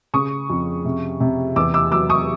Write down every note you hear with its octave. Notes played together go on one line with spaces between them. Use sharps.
C#3 C#6 D#6
F2
C3
C3
E2 D6 E6
D6 E6
F#3 D6 E6
C#6 D#6